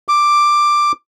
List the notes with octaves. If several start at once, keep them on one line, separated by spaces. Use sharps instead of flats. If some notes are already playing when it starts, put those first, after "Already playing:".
D6